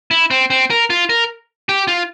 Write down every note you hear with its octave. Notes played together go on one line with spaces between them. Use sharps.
E4
C4
C4
A#4
F4
A#4
G4
F4